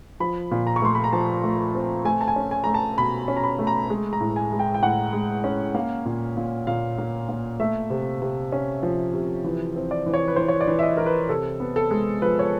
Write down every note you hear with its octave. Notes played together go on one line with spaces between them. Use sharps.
F3 B5
A#2
A#5
C#6
A3 C6
B5
A#5
F3 A5
A3
C4
A3 G#5
A5
G#5
C#4
G#5
A3 A#5
A5
B2 B5
C#4
A#5
B5
A3
A#5
G#3
A#5
A2
G#5
G#3
G5
G5
A2 F#5
G#3
C#4
A#3 F5
A#2
A#2
A#2 F5
A#3
A#3
A3 E5
C3
C3
C#4
F3
C3
E3
C4
D5
E3
C#5
B4
E3 C5
C#5
D5
E3
E5
D#5
E3 A#4
B4
C3 A4
B3
A4
G#3
F3 B4
C#5